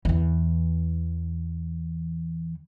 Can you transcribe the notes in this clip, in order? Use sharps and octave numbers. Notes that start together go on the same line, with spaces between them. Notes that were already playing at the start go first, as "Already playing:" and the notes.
E2 E3